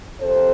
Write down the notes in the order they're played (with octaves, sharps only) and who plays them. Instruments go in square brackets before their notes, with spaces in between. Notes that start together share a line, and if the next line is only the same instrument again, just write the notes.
[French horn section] F2 C3 A4 C5